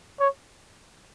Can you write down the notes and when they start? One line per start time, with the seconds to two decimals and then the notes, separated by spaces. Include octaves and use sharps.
0.20 C#5